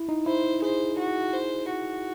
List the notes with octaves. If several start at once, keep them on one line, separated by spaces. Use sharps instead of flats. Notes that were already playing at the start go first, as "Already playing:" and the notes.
Already playing: E4
D#4
E4 C5
G#4 C5
F#4
C5
F#4